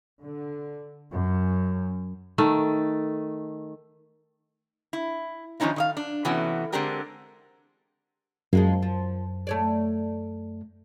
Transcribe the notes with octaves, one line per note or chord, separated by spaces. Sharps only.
D3
F#2
D#3 A3
E4
D#3 F3 C#4 D#4 E4
D#3 D#5 F5
D4
C3 E3 A3 B3 C#4 F#4
D3 G#3 C4 D4 G4 A#4
F#2 F3 G#3 A#3
F3
A3 C#5 D5